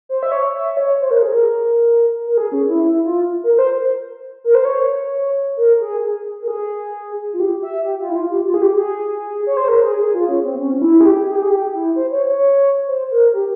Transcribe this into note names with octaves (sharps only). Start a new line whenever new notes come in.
C5
E5
C#5
E5
E5
C#5
C5
A#4
G#4
A#4
A#4
G#4
C#4
E4
E4
F4
A#4
A#4
C5
A#4
C5
C#5
A#4
G#4
A#4
G#4
F4
G4
E5
G4
F4
E4
F4
G4
F4
G#4
G4
G#4
C#5
C5
A#4
G#4
G#4
F4
C#4
C4
C#4
C#4
E4
G#4
G4
G#4
G4
G#4
G4
E4
C5
C#5
C#5
C5
A#4
G4